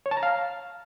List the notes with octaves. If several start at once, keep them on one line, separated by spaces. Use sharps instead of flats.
C#5
A5
A#5
F5